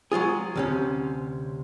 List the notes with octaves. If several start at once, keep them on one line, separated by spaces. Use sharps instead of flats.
F#3 G#3 F4 G#4
D2 C3 C#4